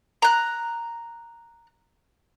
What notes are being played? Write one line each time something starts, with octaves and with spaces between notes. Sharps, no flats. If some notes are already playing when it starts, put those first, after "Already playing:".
A#5 F#6